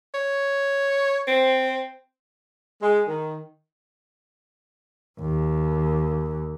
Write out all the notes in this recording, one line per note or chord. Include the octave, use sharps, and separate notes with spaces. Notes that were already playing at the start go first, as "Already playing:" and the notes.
C#5
C4 C5
G#3
D#3
D#2